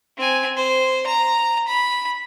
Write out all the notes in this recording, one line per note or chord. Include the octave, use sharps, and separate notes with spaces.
C4 G#5
C5
A#5
B5